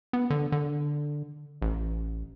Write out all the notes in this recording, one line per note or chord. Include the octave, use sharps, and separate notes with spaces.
B3
D3
D3
A1